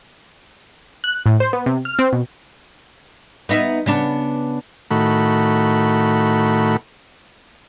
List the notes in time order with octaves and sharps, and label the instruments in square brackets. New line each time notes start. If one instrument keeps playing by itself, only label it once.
[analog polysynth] F#6
A2
C5
B3
C3
F6
C4
B2
[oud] B3 D#4 E5
C#3 B3 D4
[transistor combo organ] A2 D#3 A3 F#4 B5